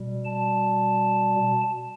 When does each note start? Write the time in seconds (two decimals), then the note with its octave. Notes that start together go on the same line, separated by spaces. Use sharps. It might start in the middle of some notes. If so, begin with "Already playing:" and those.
Already playing: B2 G3
0.25 A5